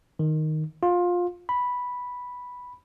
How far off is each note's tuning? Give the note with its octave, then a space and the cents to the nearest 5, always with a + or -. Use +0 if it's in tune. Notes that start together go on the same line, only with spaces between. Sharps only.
D#3 -5
F4 +20
B5 -5